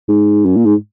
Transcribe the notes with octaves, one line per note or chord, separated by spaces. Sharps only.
G#2
F#2
A#2
G#2